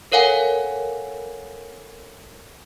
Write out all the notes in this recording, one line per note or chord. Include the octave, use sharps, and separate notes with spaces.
A4 A#4 C#5 F5 F#5 G#5